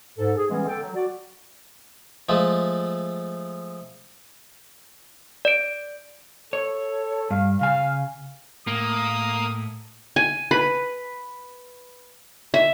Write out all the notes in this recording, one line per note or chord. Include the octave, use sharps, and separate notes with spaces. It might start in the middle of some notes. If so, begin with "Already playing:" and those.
G#2 A4
G#4
E3 G3 G#3 B3 C#4
D3 A4 G5
F#3
F#4 D5
F3 G#3 A3
D5 D7
A4 C#5
G2 F5
C#3 F5 G#5
A2 A#3 D#6
G#5
B4
E5